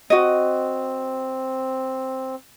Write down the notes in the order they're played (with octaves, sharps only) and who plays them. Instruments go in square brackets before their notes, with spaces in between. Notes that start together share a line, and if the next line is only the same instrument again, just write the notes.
[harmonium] C4 [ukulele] F#4 D#5